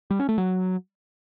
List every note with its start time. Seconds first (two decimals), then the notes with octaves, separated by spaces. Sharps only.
0.10 G3
0.20 C#4
0.29 A3
0.38 F#3